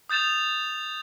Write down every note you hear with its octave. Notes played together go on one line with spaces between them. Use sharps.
D#6 G6 A6 E7 F7